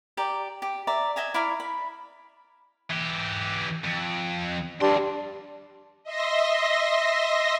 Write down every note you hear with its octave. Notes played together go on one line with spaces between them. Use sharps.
G4 D5 A#5
G4
D5 E5 A#5
D#5 E5 G#5 A#5
E4 D5 F5 A#5
B5
E3 G4
F2
E2 G3 D4 C6
D#5 E5 C6 A#6